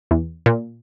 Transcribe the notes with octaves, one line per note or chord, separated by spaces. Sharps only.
E2
A#2